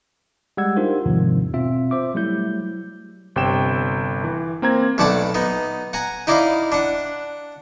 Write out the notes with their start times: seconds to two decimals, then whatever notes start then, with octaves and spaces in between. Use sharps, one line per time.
0.57 G3 G#3 F#5 E6 G#6
0.76 D4 D#4 F4 G4 A#4 C5
1.06 E2 G#2 C3 D#3 F3
1.54 B2 C4 F4 E5
1.91 C5 E5 D6
2.14 F#3 G3 A3 E4 G6
3.36 G1 C3 G5 E7
4.24 E3
4.62 A#3 C4 A#5 G#6
4.98 B1 A3 D5 F#5 A5 B5
5.34 B3 D#4
5.93 F#5 G#5 A#5
6.27 D#4 E4 D5 D#5 F5 B5
6.72 D4 F#5